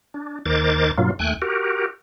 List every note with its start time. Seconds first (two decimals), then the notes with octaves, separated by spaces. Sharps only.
0.14 D4
0.46 D#2 D#3 A#4 C5 D6 A6
0.98 G2 B2 F#3 A#3 F4
1.19 D#2 A3 G5 G#5 F#6
1.42 F#4 G4 A#4